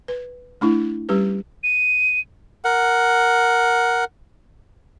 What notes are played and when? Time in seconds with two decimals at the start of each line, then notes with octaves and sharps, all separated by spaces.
0.08 B4
0.61 A3 D4 E4
1.09 G3 C#4 G4 B4
1.63 D#7
2.64 A#4 F#5